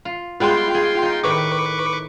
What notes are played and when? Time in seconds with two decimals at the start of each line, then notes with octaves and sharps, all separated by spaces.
0.05 F4
0.40 G3 G#3 B3 F4 G5 C6
0.74 G#4
1.03 D#4
1.24 A2 D#3 B4 C#6 D6